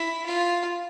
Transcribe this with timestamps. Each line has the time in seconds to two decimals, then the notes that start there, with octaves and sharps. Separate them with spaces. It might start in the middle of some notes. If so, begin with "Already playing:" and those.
Already playing: E4
0.26 F4